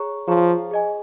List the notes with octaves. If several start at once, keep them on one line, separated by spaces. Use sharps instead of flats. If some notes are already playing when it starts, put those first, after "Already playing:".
Already playing: G#4 C#5 A#5 C#6
F3 G#4 C#5 A#5 C#6
G#4 D#5 G#5